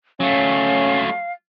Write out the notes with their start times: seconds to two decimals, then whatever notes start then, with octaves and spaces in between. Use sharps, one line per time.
0.20 F#3 A3 C#4 F5